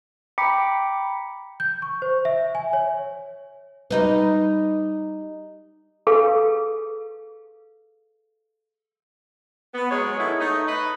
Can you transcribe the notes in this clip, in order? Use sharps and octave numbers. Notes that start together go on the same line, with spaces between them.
G5 A#5 B5 D6 B6 C#7
G6
C#6
C5
E5
G#5
C#5
G3 D#4 B4
G#4 A4 B4 F5
B3
F#3 G#3 C#5
D#3 B3 E4 A4
A3 D#4
B4 D#5